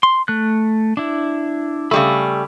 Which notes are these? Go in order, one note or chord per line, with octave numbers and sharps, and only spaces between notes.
C6
A3 F#6
D4 E4
C#3 G3 A3 B5 E6